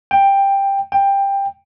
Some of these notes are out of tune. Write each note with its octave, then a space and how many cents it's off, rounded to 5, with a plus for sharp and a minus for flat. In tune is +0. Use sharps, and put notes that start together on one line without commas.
G5 +10
G5 +15